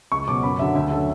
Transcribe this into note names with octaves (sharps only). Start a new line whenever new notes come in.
C#2 C#6
B2 F#3 D6
F#2 B5
D3 F#3 E5
D2 E5
D3 F#3 A4